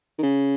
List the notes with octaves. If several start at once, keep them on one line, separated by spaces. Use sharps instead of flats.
D#3
C#3